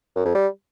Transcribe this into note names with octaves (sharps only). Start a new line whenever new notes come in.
F#2
F2
G3